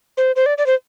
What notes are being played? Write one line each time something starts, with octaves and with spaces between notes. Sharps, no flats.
C5
C5
D5
D5
C5